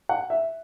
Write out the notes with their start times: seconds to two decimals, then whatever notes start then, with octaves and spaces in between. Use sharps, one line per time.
0.09 F#5
0.30 E5